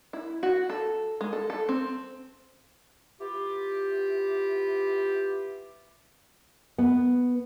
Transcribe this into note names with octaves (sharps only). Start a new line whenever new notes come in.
E4
F#4
A4
G#3
A4
A4
C4
B3 E4 F4 G4
B3